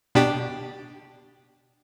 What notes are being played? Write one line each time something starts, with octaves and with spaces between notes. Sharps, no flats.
B2 D4 G4